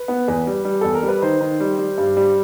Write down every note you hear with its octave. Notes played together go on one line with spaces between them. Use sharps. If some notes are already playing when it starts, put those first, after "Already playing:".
Already playing: B4
B3
E2
G3
G3
E2 A4
A#4
G3
B4
D#3 C5
D#3
G3
G3
G2
G3